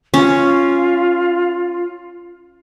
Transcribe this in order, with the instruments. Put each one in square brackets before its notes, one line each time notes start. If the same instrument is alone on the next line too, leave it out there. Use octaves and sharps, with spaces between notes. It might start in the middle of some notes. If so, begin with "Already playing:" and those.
[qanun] C#4 [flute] F4